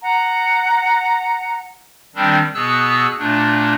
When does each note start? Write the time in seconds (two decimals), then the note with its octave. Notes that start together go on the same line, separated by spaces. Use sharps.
0.01 F#5 A#5
2.15 D#3 G3 C4 D4
2.54 B2 B3 G#4 E6 F#6
3.19 A#2 A3 D4